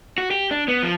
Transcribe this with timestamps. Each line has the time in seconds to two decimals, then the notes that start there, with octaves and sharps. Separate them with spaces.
0.18 F#4
0.31 G4
0.51 D4
0.68 B3
0.83 F3